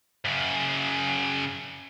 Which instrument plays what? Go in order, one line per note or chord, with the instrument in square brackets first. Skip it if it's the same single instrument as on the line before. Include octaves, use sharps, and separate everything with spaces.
[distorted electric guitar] F#2 C#3